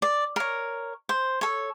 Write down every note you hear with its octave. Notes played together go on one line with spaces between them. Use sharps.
D5
A#4 C#5
C5
A4 C#5